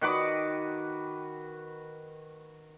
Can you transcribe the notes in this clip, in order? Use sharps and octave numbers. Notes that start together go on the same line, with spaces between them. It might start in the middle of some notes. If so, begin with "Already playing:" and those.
D#3 F#4 B4 D6